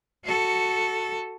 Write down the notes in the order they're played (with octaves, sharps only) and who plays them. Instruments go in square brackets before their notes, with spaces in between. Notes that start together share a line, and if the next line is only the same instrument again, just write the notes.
[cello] F#4 A4